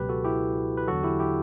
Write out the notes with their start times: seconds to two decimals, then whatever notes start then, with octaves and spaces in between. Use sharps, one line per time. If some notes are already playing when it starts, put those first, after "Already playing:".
Already playing: C#2 B2 F#3 G4 B4
0.09 F#4 A4
0.24 E4 G4
0.77 B4
0.87 E2 D3 F#3 F#4 A4
1.03 E4 G4
1.19 E4 G4